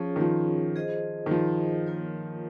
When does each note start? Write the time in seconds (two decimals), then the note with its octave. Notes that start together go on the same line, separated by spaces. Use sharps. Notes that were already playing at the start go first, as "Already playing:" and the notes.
Already playing: F3 C#4 F4 G#4 C#5
0.16 D#3
0.21 F3
0.76 F4 G#4 C5 D#5
1.26 D#3
1.31 F3
1.86 A#3 F4 A#4 C#5